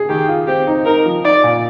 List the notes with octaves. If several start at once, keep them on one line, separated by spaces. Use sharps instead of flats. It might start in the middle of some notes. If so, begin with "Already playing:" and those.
Already playing: G#4
D#3 G4
F4
C4 G4
D#4
D#4 A#4
F3
D#4 D5
A#2